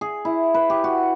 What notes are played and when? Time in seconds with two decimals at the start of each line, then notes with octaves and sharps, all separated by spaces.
0.01 G#4
0.25 E4
0.54 B4
0.70 G4
0.84 F#4